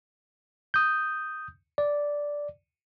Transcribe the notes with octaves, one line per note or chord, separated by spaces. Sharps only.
D#6 G6
D5